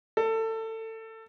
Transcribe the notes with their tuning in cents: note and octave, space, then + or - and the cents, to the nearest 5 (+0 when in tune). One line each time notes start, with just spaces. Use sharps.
A4 +25